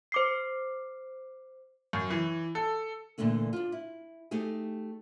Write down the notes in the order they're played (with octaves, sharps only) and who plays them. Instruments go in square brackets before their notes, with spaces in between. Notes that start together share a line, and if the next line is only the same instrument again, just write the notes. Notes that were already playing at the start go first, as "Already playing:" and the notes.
[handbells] C5 D6 C7
[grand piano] F#2
E3
A4
[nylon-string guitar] A#2 D3 E3 A3 D4
D4 F4
E4
A3 D#4 G4 G#4